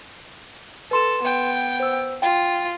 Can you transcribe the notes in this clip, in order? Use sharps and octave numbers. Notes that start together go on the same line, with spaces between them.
A4 B4 C6 E7
B3 G5
C5 E6
F4 G5